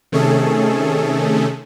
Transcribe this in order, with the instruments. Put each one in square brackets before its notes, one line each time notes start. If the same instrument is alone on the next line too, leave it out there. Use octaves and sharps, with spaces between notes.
[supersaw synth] C3 D#3 A3 C#4 G#4 A4